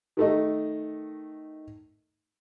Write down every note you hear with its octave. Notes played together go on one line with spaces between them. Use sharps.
D#3 A3 D#4